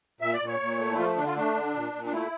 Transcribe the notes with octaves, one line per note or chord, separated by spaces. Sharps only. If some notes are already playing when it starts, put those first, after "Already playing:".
A#2 E5
D5
A#2
C#5
A#2
A3
E4
F3 F4
D3 D4
F4
A3 D4
D3
A#2
A#2
D4
A3 E4